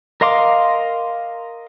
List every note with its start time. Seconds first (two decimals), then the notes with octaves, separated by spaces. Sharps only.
0.21 A#4 D#5 F5 C6 D6